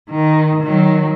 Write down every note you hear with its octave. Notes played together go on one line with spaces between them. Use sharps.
D#3
D#3 F#3